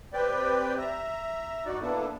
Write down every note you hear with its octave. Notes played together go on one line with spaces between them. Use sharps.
C4 G4 B4 D5 G5
E5 A#5
G2 D#4 F#4 D5
A#3 B3 D4 E4 A4